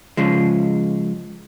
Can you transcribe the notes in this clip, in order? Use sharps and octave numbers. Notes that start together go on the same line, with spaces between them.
C#3 F3 G#3